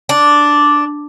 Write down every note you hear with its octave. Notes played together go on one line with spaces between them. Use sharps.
D4